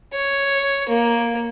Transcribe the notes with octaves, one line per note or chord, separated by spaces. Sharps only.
C#5
A#3